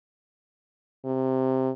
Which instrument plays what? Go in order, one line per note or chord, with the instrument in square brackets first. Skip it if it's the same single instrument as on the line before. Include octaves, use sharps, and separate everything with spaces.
[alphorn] C3